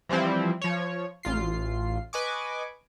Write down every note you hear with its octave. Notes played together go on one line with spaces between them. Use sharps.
E3 F3 G3 C4 E4
F3 C#5
A1 F4 C7
B4 D#5 G#5 C#6 D6